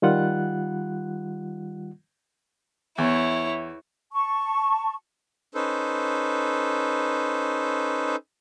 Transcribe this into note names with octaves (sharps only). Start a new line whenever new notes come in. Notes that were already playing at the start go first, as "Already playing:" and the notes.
D#3 G3 F4 F#5 F#6
E2 E4 C#5
A5 C#6
C#4 D#4 A4 B4 C5